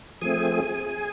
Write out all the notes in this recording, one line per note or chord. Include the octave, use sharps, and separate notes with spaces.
F3 A3 C4 G#4 G#5